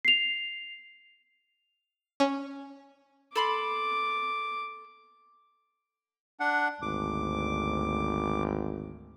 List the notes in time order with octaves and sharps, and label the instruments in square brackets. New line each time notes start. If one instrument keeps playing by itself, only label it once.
[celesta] C7 F7
[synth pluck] C#4
[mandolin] A4 B5 C6 [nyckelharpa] D6
[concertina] D4 F#5
[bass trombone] G#1 [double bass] D2 [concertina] D6